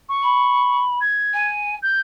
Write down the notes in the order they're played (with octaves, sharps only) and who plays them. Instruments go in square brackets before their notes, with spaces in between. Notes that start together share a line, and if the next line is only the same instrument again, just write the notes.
[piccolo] C#6
[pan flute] B5
[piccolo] G#6
[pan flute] G#5
[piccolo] G6